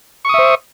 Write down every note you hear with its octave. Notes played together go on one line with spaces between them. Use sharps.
C5 E5 C#6 D#6